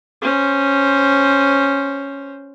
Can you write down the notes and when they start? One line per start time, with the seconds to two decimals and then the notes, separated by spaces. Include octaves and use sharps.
0.22 C#4 C5